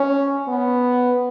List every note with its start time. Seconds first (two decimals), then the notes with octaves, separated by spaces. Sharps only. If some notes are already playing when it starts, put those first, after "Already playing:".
Already playing: C#4
0.48 B3